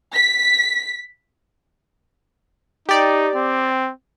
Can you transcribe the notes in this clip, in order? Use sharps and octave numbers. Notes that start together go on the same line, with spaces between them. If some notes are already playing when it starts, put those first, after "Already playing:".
B6
D#4 G4 D5
C4